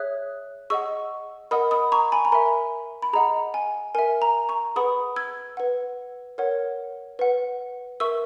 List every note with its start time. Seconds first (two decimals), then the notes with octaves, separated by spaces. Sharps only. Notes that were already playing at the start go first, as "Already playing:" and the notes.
Already playing: G#4 C#5 E5 D#6 F#6
0.70 G#4 D#5 F#5 C#6 E6
1.51 A#4 D#5 F#5 B5 D#6
1.71 B5 D#6
1.92 A#5 C#6
2.12 G#5 B5
2.25 A#5
2.32 A#4 E5 G#5 B5
3.02 B5
3.13 G#4 D#5 F#5 A#5
3.54 G#5
3.95 A#4 E5 G#5
4.22 A#5
4.49 A#5 C#6
4.76 G#4 B4 F#5 B5 D#6
5.16 E6 G#6
5.57 B4 F#5
6.38 A#4 C#5 F#5
7.19 B4 F#5
8.00 A#4 E5 C#6 E6